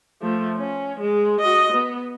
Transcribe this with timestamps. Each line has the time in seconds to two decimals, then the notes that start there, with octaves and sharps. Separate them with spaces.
0.21 F3 A3
0.57 C#4
1.00 G#3
1.41 F#4 D#5
1.72 B3